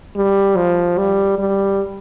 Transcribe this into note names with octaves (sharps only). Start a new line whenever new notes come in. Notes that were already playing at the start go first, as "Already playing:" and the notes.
G3
F3
G3
G3